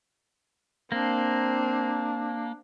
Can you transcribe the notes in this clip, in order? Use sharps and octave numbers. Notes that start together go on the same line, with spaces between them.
A#3 C4 D4